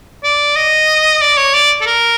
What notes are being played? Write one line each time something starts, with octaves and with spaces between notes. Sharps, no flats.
D5
D#5
D5
C#5
D5
A4
A#4